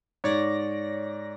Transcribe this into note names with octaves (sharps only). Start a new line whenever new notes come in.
G#2 C#5 D5 A#6